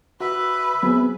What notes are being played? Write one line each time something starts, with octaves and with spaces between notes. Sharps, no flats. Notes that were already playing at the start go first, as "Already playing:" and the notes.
F#4 B4 E5 B5
F#3 B3 C4 G#4